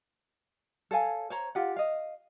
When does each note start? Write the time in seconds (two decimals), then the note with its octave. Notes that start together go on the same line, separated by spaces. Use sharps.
0.91 A4 C#5 F5 G#5
1.30 C5 C#5 A#5
1.55 F4 G4 F#5
1.76 D#5 F5